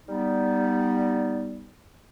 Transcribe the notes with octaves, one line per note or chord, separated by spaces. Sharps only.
G3 B3 D#4